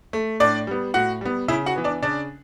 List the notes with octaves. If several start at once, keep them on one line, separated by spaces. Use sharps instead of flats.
A3
A2 D4 D5
G3 B3
A2 F#4 F#5
G3 B3
C#3 E4 E5
F#4 F#5
E3 B3
D4 D5
C#3 D4 D5